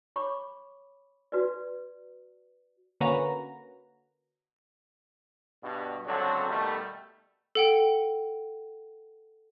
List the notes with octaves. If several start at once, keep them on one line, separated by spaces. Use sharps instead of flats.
C#5 B5 C#6 D6
F#4 B4 D5
D3 A#3 C#4 F#4 B4 A#5
G2 B2
C#2 D3 F#3 C4 F#4 A4
B2 D#3 G3 A3
A4 F#5 G5